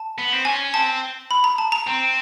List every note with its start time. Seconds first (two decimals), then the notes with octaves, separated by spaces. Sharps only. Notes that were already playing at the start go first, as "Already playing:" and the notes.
Already playing: A5
0.18 B3
0.32 C4
0.45 C#4 G#5
0.74 C4 A5
1.31 B5
1.44 A#5
1.58 A5
1.72 A#5
1.87 C4